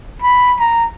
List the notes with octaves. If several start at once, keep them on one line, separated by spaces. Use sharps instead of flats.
B5
A#5